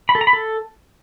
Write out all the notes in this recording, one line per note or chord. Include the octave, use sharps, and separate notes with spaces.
B5
A4
A#5
B5
A4